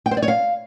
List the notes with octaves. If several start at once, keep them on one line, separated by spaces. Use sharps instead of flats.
G5
C5
D5
C#5
F5